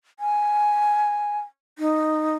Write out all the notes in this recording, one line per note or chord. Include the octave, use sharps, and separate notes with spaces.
G#5
D#4